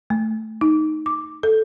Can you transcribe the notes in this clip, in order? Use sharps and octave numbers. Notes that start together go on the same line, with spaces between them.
A3
D#4
D6
A4